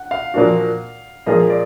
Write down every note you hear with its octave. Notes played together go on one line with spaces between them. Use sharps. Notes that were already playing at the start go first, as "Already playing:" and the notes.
Already playing: F#5
F5
A#2 F3 A#3 D4 F#4
A#2 F3 A#3 F4 G#4 D#5
D5